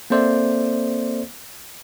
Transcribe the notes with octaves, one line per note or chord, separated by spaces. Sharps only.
A#3 C4 A4 C5 D5 E5